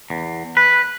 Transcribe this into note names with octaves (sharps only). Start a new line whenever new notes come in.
E2
B4